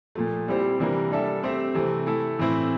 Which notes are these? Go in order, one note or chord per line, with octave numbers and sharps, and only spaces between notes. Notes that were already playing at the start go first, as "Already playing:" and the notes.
A#2 F3 A3
G3 C4 E4 G4 C5
C3 E3 G3 A#3 D4
G3 D4 A4 E5
A3 C4 G4 C5 E5
C3 E3 A3
A3 E4 A4
A2 E3 A3 C4 E4